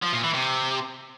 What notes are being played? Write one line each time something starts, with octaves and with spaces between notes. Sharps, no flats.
F3
A#2
E3
C3